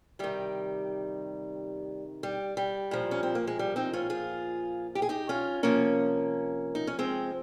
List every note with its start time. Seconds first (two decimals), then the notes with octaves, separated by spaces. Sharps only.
0.19 C3 D#3 G3
2.23 G3
2.57 G3
2.91 A#2 F3
3.11 C#4
3.23 C4
3.35 A#3
3.47 G#3
3.59 G3
3.76 C4 D#4
3.93 C#4 F4
4.10 F4 G#4
4.95 G4
5.02 G#4
5.09 D#4 G4
5.29 C#4 F4
5.63 C3 F3 A#3 C#4
6.75 D#4
6.87 C#4
6.99 G#3 C4